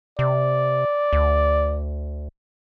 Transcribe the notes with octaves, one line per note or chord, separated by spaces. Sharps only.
C3 D5
D2